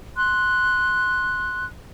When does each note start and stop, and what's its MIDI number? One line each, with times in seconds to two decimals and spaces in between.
0.16 1.64 84
0.16 1.64 90